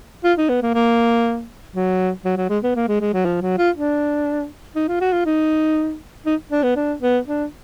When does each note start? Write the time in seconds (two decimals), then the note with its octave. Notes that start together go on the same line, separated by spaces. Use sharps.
0.24 F4
0.38 D#4
0.49 B3
0.62 A#3
0.74 A#3
1.75 F#3
2.25 F#3
2.37 F#3
2.49 G#3
2.63 B3
2.75 A#3
2.88 G#3
3.01 G#3
3.13 F#3
3.25 F3
3.42 F#3
3.58 F4
3.75 D4
4.76 D#4
4.88 F4
5.01 F#4
5.13 F4
5.26 D#4
6.26 D#4
6.52 D4
6.63 B3
6.76 D4
7.00 B3
7.27 D4